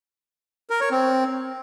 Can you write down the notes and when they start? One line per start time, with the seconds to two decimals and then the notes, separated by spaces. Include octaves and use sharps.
0.70 A#4
0.81 C#5
0.91 C4